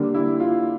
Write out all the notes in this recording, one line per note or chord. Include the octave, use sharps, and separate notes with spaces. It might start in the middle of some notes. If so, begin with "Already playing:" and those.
Already playing: D3 G3 A#3 D4
E4
F4